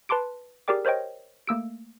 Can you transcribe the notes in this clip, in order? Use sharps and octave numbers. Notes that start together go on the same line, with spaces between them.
B4 A5 C6 D6 D7
G4 G#4 A#4 D5 G5 D6
A#4 C5 C#5 D#5 G5
A3 A#3 E6 D7